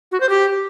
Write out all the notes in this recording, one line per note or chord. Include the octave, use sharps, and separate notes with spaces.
F#4
C5
G4